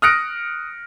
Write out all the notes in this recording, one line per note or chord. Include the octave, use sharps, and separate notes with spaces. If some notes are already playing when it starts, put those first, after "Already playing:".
D#6 F6 F#6 A#6 C#7 D7